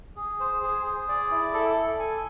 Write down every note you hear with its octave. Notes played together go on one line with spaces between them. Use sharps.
G#4
C5
G#4
G#4
D5
E4
A4
A4
G#5